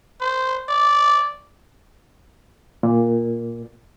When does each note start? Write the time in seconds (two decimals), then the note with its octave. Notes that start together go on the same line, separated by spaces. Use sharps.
0.21 C5
0.69 D5
2.83 A#2